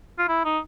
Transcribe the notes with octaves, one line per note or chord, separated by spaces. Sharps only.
F4
E4
D#4